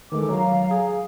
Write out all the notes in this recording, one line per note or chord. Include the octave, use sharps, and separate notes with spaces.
D#3 E3 G#3 A4 D6
F#3 F5 A#5
G#4